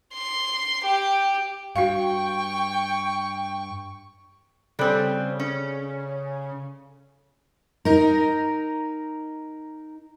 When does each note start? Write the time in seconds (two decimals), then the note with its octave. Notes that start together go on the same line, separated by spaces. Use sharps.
0.13 C6
0.84 G4
1.76 G2 F#4 F5 G5 C#6
4.79 C#3 G3 C4 A4 D5 F#6
5.40 C#4
7.85 D#4 A#4